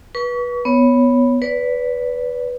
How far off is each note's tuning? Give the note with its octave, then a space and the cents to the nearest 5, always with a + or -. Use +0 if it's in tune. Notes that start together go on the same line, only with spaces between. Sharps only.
B4 -20 C#6 +35
B3 +0 C#5 +0
B4 +0 D5 -35